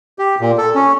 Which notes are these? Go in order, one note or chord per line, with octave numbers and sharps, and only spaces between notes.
G4
A#2
A4
C#4